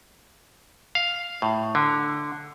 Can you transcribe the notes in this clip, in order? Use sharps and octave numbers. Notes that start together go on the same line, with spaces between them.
F5
A2
D3